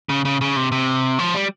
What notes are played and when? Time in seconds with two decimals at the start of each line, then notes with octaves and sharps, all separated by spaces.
0.09 C#3
0.25 C#3
0.41 C#3
0.56 C3
0.72 C3
1.19 F3
1.35 G3